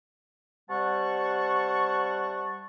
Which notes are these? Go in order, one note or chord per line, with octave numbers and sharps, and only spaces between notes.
C3 G3 F#5 A5 C#6